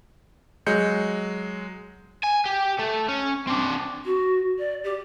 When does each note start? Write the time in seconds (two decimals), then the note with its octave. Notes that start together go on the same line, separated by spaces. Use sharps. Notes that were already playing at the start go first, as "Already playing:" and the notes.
0.66 F#3 G#3 G6 C#7
2.23 G#5
2.45 G4
2.79 A3
3.09 C#4
3.47 C4 D4
4.05 F#4
4.59 D5
4.84 G4